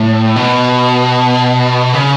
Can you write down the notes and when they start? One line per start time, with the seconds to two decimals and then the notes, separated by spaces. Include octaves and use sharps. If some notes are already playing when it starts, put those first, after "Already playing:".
Already playing: A2
0.36 B2
1.94 C#3